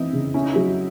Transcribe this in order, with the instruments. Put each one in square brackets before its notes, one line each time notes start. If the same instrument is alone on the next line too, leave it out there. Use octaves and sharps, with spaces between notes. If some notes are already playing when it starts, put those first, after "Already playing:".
Already playing: [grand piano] E3 C4 [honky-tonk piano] D#4 E4
[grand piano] C#3
[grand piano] C#4 [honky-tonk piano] E4
[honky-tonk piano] D#4
[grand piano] F#3 [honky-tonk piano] E4